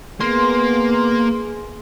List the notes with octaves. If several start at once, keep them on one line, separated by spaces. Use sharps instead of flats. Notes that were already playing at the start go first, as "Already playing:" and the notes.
A#3 B3 G#4 C6